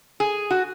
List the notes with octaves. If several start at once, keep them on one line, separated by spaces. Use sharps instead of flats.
G#4
F#4